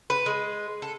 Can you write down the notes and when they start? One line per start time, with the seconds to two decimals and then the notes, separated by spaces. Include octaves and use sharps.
0.10 B4
0.26 G#3
0.82 A4